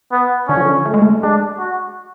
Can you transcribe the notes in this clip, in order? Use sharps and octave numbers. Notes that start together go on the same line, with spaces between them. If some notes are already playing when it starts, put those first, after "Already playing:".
B3
D3 C#4
F3
D3
A3
G#3
A3
G#3 D4
F#4